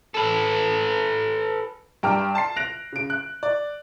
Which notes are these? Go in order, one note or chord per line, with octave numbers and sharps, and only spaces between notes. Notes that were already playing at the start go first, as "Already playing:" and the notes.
A4 B4
G2 G5 A#5 D6 F6
A5 C6 C7
F#6 A#6 D7 F7
C#3 D7
F#6
D5